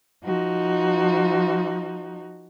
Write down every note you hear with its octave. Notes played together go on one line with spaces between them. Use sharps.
F3 D#4 F#4